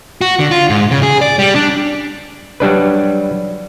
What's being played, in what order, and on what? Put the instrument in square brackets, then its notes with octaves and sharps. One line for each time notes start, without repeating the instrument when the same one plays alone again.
[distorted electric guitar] F#4
D3
F4
G#2
C#3
G#4
D5
G3
D4
[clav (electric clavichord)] F#3 G3 D4 B4